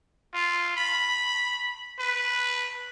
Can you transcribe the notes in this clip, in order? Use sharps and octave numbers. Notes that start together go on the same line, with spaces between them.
F4
B5
B4